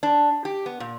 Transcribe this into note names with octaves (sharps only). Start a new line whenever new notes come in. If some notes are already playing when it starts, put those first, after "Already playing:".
D4
G4
B3
A#2